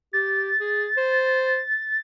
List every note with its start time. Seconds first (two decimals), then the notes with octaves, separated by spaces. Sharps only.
0.13 G4 A6
0.60 G#4
0.97 C5